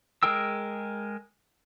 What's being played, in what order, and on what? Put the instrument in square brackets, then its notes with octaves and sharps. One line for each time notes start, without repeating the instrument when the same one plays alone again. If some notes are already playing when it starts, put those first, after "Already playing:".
[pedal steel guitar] G#3 G#4 A#4 G5 E6